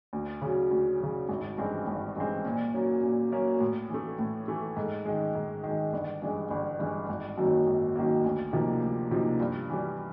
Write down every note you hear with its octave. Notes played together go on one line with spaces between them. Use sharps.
D2
C#3 F#3
D2
C#3 F#3
G#1
G2 E3 G#3 C4
G#1
G2 E3 G#3 C4
A#2
F#3 A#3 C#4
A#2
F#3 A#3 C#4
A2
E3 A3
A2
E3 A3
G#2
D#3 G#3
G#2
D#3 G#3
G1
G2 E3 G#3
G1
G2 E3 G#3
G#1
F#2 D#3 F#3 A#3
G#1
F#2 D#3 F#3 A#3
D2
C3 F3 A#3 D#4
D2
C3 F3 A#3 D#4
G2
E3 G3